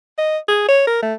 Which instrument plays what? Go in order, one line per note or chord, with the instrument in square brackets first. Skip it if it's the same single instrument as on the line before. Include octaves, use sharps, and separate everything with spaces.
[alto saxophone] D#5
G#4
C#5
A#4
A3